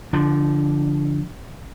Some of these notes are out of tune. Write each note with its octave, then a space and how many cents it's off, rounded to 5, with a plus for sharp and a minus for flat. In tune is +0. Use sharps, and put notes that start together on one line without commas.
D3 -30 F3 -20 D4 +0